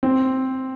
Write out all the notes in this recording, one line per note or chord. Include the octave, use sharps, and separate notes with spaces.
C4